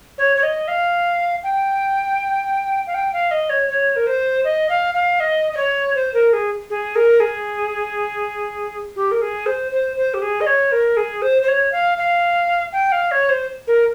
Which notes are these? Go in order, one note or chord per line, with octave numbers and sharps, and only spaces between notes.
C#5
C#5
D#5
F5
G5
F5
G5
F5
D#5
C#5
C#5
A#4
C5
D#5
F5
F5
D#5
D#5
C#5
C5
A#4
G#4
G#4
A#4
G#4
G4
A#4
G#4
C5
C5
C5
G4
G#4
D#5
C#5
A#4
G#4
C5
C5
C#5
F5
F5
G5
F5
C#5
C5
A#4